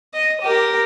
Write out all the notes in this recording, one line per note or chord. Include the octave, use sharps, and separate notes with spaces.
D#5
G4 A#4